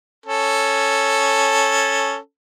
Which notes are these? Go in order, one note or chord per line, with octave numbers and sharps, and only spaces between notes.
C#4 A4